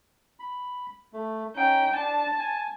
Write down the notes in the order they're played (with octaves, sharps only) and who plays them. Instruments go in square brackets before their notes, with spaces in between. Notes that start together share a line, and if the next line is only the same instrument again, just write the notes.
[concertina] B5
A3
[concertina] C#4 D#4 [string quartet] G5
[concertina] D4 [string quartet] A5
[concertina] G#5